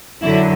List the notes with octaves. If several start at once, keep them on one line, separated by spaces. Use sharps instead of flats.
F#2 D3 F#3 E4